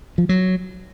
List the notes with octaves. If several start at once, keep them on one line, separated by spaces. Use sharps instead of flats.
F3
F#3